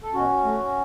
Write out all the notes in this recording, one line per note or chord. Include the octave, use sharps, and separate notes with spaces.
A4
B2 C#4 F#4
A3